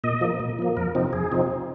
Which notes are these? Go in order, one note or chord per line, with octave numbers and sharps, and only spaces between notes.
A#2 D#5
F3 A#3
A#2
F3 A#3
F2 A#4
C3 F3 C4 D#4
F2 G#4
C3 F3 C4 D#4